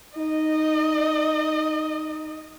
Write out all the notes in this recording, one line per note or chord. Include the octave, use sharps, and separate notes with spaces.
D#4 D#5